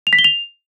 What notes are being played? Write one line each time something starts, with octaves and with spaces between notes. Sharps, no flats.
F7
B6
G7
F7